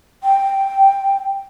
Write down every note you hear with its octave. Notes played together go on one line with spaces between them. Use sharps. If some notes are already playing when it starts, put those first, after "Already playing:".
G5